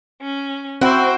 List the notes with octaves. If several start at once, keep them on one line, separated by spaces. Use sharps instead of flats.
C#4
C4 E4 F#4 C5 G5